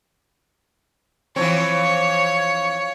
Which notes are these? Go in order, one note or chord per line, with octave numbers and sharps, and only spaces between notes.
E3 F3 C4 C#5